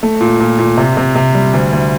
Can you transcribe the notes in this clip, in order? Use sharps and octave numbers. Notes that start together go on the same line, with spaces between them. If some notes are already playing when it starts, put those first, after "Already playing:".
A3
A#2
A#2
A#2
C3
C3
C3
G3
D2
D2